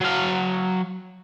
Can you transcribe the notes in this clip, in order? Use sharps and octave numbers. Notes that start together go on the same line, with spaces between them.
F#3 F5